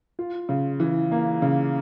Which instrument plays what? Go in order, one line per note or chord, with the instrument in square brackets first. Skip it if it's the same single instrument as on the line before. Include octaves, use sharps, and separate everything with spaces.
[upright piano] F4
C#3
E3
A#3
C#3